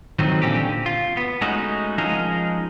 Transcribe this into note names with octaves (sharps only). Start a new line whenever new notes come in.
D#3 F3 F#3 A3 C4 D#4
A#2 D3 C4 C#4 G4
F4
B3
G#3 A3 C#4 D#4 F#4
F3 G#3 C#4 D#4 G#4 A#4